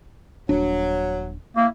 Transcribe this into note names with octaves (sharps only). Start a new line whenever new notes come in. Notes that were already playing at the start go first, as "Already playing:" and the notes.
D#1 F#3 D4
A#3 E4